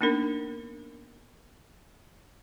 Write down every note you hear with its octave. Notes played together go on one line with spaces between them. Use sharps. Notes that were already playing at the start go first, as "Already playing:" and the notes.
A#3 B3 D4 D#4 A#4